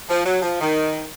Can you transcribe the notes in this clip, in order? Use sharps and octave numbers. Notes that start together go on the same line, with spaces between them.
F3
F#3
F3
D#3